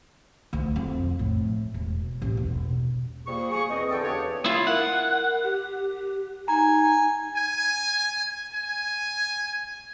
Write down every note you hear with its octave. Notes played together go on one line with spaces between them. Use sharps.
D2
F2
A2
E1
A1
E1
F3 G3 A#3 G#4 C#6
G#4 C#6
E2 C4 D#5
D3 G#4 A4 G5
E2 C#3 D4 G4 C#5
E4 F4
A#4 F#5
G4
D#4 G#5 A#5
G#5
G#5